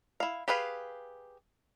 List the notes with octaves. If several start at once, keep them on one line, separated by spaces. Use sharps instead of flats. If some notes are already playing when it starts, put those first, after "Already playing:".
E4 F5
G4 G#4 B4 F5